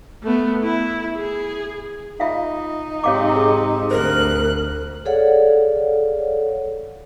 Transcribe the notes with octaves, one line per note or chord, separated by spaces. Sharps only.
A3 B3
E4
G#4
D#4 F4 E5 F5
G#2 C3 C#5 F5 D6
G#4
D2 A#4 C5 F#6
G#4 A4 C#5 D5 F5 F#5